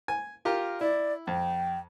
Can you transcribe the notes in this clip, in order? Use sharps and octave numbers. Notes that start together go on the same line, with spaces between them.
G#5
F4 G4 A#4
E4 D5
F2 G5